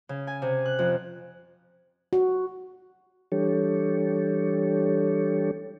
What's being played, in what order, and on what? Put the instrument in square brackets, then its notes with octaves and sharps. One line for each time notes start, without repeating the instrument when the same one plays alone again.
[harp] C#3
G#5
C3
F#6
F2
[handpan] F#4
[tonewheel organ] E3 G3 D4 G4 A4 C#5